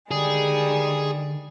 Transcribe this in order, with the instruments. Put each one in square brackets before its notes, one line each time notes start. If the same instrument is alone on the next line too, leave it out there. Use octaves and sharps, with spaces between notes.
[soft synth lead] D3 [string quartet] D#3 G3 G#3 [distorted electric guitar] G#4